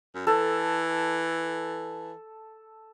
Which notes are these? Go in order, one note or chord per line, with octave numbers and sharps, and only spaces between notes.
F#2
E3 A4